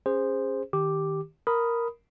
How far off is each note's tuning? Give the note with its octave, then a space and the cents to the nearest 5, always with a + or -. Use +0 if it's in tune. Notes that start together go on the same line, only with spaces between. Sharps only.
C#4 -15 G#4 -25 C5 +0
D#3 +0 G4 +0 D6 +0
A#4 +0 B5 +0 D#6 +0